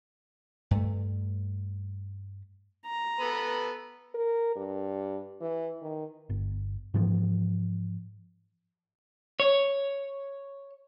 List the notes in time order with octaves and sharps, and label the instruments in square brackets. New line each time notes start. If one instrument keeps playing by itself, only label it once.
[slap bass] G2 A3
[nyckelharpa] A#5
[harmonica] B3 A4 B4
[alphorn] A#4
G2
E3
D#3
[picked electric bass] G1
G#2 E3 F3
[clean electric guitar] C#5